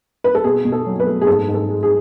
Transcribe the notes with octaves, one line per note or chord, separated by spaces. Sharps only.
B4
A4
B2 G#4
B2
A4
F#3
B4
A3
G#4
G#2 A4
G#2
A4
G#3
G#4